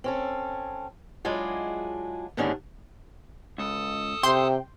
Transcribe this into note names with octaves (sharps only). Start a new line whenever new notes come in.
C4 C#4 A4
F#3 G#3 D4 E4 F4 G#4
D#2 G#2 D3 D#3 C#4 D4
C#2 A4 A5 D#6
C3 G5 C6 G6